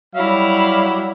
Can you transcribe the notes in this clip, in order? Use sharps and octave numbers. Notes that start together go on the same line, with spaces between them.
F#3 G3 E4 F5